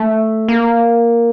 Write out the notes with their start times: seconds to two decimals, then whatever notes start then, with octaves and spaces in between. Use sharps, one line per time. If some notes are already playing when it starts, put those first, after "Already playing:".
Already playing: A3
0.48 A#3